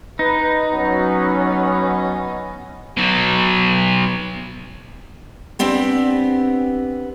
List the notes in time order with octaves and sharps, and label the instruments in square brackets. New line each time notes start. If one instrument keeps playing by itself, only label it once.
[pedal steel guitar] D#4 [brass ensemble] B4
[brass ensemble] F#3 B3 C#4
[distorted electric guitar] B2 F#3
[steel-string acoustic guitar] B3 C4 D4 G4